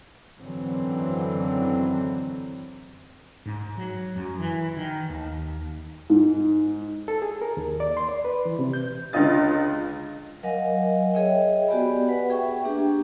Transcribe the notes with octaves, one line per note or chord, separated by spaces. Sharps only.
G#1 F#2 D3 E3 F#3 C4
G#2
F#3
F#2
E3
D#3
D#2
G#2
A4
G#4
A#4
D#2
D5
C6
D5
B4
E3
C3
G6
C#2 D3 F4 D#5 A6
F#3 A#4 D#5 F5 F#5 G#5
G#4 C#5 D#5 E5 G5
B3 F#4 G4 D5 G#5 B5
B4 F#5 B5
G#4 E5 G5 C#6
A#3 D4 G4